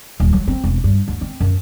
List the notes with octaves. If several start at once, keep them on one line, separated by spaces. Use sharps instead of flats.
D#1
F#3
C4
E1
G2
D2
C4
F#2